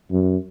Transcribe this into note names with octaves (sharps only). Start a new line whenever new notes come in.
F#2